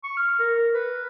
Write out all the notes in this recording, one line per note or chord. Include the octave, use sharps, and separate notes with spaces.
C#6
F6
A#4
B4